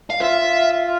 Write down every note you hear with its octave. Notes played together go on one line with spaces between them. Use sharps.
F5
F4 E5